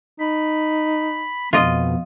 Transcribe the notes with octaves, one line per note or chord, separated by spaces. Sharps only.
D#4 B5
F2 B2 F4 D#5